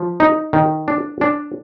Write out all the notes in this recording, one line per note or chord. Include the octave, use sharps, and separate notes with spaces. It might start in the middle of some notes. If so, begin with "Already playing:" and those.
Already playing: F3
D#4
D#3
D4
D4